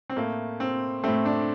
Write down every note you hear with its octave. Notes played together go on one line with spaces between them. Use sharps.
C4
A2 A3 A#3
C4
A2 A3 C4
D4